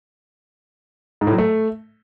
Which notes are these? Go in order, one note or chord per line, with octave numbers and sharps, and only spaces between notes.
G#2
A2
F#3
A3